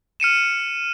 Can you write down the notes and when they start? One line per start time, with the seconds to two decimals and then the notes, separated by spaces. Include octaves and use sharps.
0.20 F6 C#7 D#7 E7